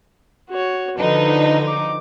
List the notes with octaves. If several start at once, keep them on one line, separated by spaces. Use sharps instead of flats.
F#4 C#5
D3 F3 D#4 B4
D6